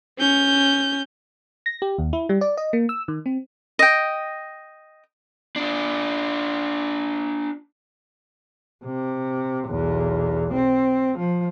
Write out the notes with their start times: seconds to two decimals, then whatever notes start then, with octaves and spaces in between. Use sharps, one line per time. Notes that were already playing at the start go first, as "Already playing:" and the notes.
0.18 C#4 G6
1.66 A#6
1.82 G4
1.98 D#2
2.13 E4
2.29 G3
2.41 D5
2.57 D#5
2.73 A#3
2.89 E6
3.08 D#3
3.26 C4
3.79 D#5 G5
5.56 D4 F4
8.85 C3
9.69 B1 E2
10.54 C4
11.19 F3